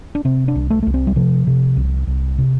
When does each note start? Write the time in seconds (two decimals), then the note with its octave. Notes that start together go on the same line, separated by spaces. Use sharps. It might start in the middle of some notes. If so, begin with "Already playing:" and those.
0.15 D4
0.25 C3 C4
0.48 D4
0.55 C2
0.70 A3
0.83 C2 A3
0.94 C4
1.07 G3
1.16 C3 F3
1.47 C3
1.77 C2
2.07 C2
2.38 C3